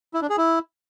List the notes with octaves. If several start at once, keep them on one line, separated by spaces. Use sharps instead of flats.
E4
D4
G#4
E4